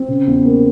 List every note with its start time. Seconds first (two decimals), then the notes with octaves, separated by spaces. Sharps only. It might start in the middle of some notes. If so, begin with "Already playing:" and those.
Already playing: C4
0.08 C#3
0.27 E2
0.45 A#3